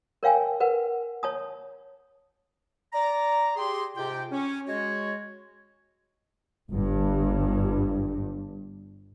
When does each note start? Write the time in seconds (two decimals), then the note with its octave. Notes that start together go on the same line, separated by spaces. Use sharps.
0.23 A#4 C#5 F5 G5 G#5
0.60 A#4 B4 F#5
1.23 C#5 A5 D#6
2.93 D5 A#5
3.56 G4 G#4 C6
3.96 G#2 C3 F4 G4 G5
4.32 C#4
4.66 G#3 F#4 C#5
6.70 G1 G2